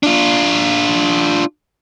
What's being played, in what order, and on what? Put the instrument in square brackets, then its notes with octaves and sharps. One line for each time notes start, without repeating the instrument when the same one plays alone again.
[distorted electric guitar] D4 F4